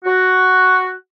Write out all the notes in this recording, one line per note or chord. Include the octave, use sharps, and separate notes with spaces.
F#4